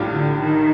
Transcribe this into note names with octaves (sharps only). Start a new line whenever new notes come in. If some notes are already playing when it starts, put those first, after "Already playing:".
Already playing: A#1 A2 G3 D4 F4
D3
D#3